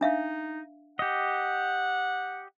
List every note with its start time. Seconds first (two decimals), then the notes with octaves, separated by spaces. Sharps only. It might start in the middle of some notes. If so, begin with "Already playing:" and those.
0.01 D4 D#4 E5 F5
0.99 G4 D#5 F#5